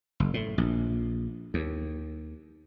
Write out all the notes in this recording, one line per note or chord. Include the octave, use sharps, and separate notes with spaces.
F#1
A2
A#1
D#2